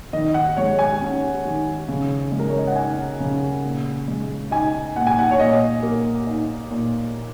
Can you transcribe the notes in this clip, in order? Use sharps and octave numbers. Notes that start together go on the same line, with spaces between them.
D#3 D#5
F#5
G#3 C#5
G#5
C#4
D#3
C#3
G#3
A#4
C#5
D#5
F#5
D#4 G#5
C#3
A#2
G#3
D#4 G#5
A#2 F#5
G#5
F#5
C#5
A#2 D#5
A#3
D#4
A#2